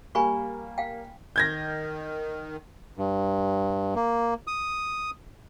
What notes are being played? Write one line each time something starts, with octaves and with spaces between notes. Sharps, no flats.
G3 A#3 G#5 B5 C#6
F5 G5
D#3 G6 G#6 A#6
G2
A#3
D#6